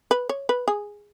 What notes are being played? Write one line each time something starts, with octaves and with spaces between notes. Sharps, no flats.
B4
C#5
B4
G#4